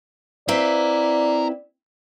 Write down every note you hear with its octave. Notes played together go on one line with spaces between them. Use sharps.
C4 E4 B4 D5 F5 A#5